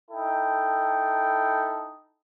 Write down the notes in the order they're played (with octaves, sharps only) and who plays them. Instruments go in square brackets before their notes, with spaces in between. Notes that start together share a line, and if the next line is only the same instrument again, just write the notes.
[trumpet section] D#4 E4 A4 G5 A5